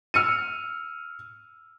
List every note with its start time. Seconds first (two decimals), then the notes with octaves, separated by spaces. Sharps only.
0.14 E6 F6 C#7 D#7